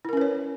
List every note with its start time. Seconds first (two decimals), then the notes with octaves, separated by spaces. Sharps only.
0.05 E4
0.09 A#4
0.13 C#4
0.17 B4
0.21 C#5